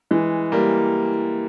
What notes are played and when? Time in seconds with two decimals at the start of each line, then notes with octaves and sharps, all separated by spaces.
0.11 E3 G#3
0.52 G3 A#3